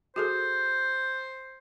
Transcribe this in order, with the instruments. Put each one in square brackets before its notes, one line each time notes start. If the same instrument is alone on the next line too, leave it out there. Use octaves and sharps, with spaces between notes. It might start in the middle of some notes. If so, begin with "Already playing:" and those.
[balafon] F#4 G#4 A4 [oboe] C5